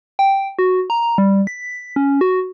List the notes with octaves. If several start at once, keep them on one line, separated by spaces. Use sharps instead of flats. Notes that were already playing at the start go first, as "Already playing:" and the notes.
G5
F#4
A#5
G3
B6
C#4
F#4